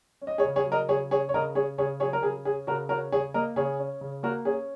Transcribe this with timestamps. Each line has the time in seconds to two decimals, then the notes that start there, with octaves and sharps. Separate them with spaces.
0.22 C#4
0.27 D#5
0.38 G#4 C#5
0.45 C#3
0.56 G#4 C#5
0.66 F#3
0.72 A#4 D#5
0.89 C#3 G#4 C#5
1.11 C#4 G#4 C#5
1.29 C#5
1.34 C#3 A#4 D#5
1.55 C#4 G#4 C#5
1.78 C#3 G#4 C#5
2.00 F#3 G#4 C#5
2.13 A#4
2.22 C#3 G#4
2.45 C#4 G#4
2.67 C#3 F#4 A#4
2.89 C#4 F#4 A#4
3.12 C#3 G#4 C#5
3.34 A#3 A#4 D#5
3.56 C#3 G#4 C#5
3.79 C#4
4.01 C#3
4.23 A#3 F#4 A#4
4.45 C#4 G#4